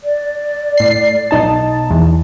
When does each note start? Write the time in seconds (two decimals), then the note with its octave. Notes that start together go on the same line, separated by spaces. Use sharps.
0.04 D5
0.78 A2 C7
1.31 B1 D#4 A5
1.90 E2